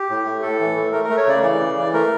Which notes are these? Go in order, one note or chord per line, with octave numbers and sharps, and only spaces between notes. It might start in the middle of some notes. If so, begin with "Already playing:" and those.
Already playing: G4
A2
A3
A2 A4
E3
A3
A3 A#4
A#4
A3
C#5
C#3 D5
E3 D5
C#3
E3
A3 A#4